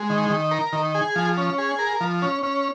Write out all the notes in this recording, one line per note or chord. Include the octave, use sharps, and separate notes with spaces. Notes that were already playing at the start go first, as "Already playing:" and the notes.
Already playing: G#3
D#3
D#3
A#4
D#3
G#4
F3
C#4
G#4
A#4
F3
C#4
C#4